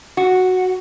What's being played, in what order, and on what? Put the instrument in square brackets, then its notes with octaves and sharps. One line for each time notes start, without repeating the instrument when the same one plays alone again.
[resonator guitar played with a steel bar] F#4